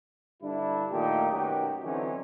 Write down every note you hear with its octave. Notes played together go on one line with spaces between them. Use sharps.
G2 D3 D4 E4
A#2 D#3 A3 A#3 D#4 G4
F#2 B2 D#3 F#3 F#4 G4
D3 E3 F#3 C4 C#4 D#4